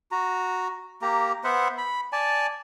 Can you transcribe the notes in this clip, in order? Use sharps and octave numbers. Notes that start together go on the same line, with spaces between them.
F#4 A#5
A#3 G4 A#5
B3 C5 E5 F#5
B5
D5 G#5 A5